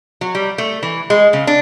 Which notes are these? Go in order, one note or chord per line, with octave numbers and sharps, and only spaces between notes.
F#3
G3
A3
E3
G#3
C#3
D4